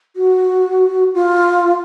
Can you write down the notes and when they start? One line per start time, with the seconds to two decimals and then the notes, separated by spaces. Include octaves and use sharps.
0.15 F#4
1.14 F4